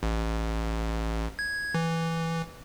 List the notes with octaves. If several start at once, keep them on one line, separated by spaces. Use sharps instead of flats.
A1
G#6
E3